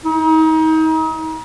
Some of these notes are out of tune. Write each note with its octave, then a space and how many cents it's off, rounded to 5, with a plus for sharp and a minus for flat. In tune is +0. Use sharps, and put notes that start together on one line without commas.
D#4 +35